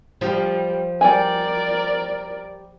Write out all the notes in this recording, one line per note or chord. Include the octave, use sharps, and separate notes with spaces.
F3 G3
G3 A#4 D5 G#5